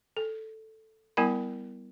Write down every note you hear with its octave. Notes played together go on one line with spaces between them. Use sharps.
A4
G3 B3 E4 A#4 G#5 B5